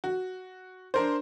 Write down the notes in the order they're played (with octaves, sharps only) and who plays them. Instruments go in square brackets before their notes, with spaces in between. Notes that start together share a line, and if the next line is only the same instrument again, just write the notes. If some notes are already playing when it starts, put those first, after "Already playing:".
[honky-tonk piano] F#4
D4 A#4 C5